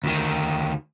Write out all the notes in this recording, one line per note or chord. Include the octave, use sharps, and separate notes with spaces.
D2 D#3